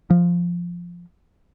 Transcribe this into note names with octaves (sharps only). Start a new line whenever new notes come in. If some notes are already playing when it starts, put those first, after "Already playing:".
F3